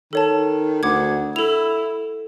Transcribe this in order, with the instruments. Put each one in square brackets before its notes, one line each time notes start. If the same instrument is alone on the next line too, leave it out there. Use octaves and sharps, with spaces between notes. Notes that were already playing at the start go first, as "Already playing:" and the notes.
[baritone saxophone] D#3 [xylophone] A4 C#5 A5
[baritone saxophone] D2 [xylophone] F#5 D6 G#6
[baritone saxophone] E4 [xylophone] A4 F7